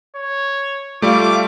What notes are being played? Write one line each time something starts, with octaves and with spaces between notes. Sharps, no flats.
C#5
G3 A3 F4 D6